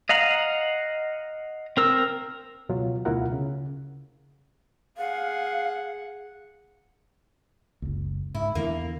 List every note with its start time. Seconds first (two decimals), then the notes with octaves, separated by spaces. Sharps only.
0.09 D#5 F5 F#5 A#5
1.77 C4 A#4 E6
2.69 C#2 B2 F#3 F4
3.05 D2 B2 E4 F4 A#4 F#5
3.33 C#3
4.98 G#4 F5 F#5
7.82 F#1 C#2
8.35 G#2 E4
8.55 E2 D3 E3 A#3